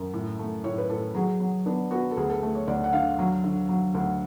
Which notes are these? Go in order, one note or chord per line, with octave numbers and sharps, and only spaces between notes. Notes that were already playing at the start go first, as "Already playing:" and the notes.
Already playing: F#2
A2
A3
A2 C#5
B4
A2 A4
F#3 G#4
F#3
B3 D4
B3 F#4
A4
D2 G#4
A4
A3
C#5
D2 D5
F#5
D3 F5
F#3
D3
F#3
D2